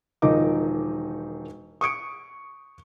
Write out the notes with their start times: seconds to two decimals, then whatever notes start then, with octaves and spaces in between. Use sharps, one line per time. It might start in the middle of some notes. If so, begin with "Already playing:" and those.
0.22 E1 D#3 F3 D#4 D#5 D6
1.81 C#6 D#6 C#7 D7